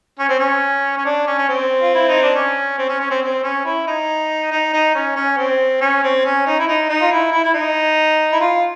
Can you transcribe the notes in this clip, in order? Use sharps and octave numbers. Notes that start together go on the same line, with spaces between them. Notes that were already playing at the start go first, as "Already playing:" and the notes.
C#4
C4
C#4
C#4
D4
C#4
C#4
C4
F4
E4
D#4
D4
C#4
C4
C#4
C#4
C4
C4
C#4
E4
D#4
D#4
D#4
C#4
C#4
C4
C#4
C4
C#4
D#4
E4
D#4
D#4
F4
E4
E4
E4
D#4
E4
F4